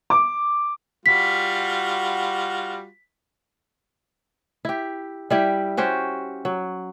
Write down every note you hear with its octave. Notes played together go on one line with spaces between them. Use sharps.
D6
G3 F4 F#4 B6
E4 G4
G3 E4 G4
C#4 F#4 G4 C5
F#3